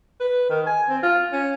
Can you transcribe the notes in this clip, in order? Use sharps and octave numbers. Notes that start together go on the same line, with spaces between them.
B4
D#3
G#5
C4
F4
C#4